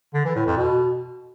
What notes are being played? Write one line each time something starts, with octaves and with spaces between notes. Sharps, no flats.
D3
E3
A2
F2
B2